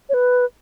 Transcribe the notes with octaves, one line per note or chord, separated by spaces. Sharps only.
C#5
B4